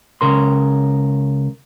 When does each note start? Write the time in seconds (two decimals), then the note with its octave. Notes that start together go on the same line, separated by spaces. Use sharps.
0.21 C#2 C#3 A#4 C6